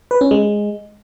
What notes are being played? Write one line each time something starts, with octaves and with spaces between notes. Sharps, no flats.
B4
C#4
G#3